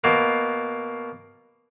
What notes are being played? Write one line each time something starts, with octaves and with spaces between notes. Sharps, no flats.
B2 A#3